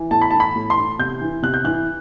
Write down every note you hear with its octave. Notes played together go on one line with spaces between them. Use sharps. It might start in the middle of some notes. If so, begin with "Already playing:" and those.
Already playing: E3
A2 A5
B5
A5
E3
B5
A2
C6
E3
C3 G6
E3
C3 F#6
G6
E3 F#6